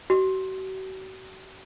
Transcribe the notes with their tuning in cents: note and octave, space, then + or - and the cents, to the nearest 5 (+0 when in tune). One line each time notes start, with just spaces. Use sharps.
F#4 +40